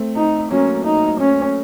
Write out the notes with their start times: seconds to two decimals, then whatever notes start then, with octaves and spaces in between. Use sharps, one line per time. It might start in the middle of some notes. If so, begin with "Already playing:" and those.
Already playing: A3 C4
0.16 D#4
0.50 F#3 A#3 C#4
0.85 D#4
1.20 C#4